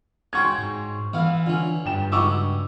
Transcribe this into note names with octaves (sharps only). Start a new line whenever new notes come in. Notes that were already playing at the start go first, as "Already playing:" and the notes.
C#4 F#4 G5 C6 C#6 G#6
G#2
A1 E3 B3 F5
D3 C#4 F4
G2 G5 E7
C#2 D#4 F#4 C#6 D6 E6